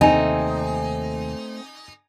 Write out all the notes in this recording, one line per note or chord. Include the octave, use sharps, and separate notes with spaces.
D#2 C3 A3 C4 D#4 G#5